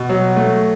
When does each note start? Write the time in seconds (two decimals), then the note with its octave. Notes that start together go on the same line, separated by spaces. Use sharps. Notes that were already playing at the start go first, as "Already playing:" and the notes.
Already playing: B2
0.09 F#3
0.37 A3